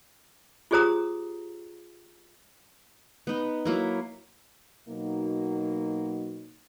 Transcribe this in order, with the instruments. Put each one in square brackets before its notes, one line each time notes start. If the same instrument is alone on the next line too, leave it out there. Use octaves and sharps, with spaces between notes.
[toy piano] F4 G4 G#4 C5 A#5 D#6
[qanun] B3 D#4
F#3 A#3 E4
[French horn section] B2 F#3 A#3 D#4